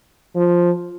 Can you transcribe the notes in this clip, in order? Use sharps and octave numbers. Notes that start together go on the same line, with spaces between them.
F3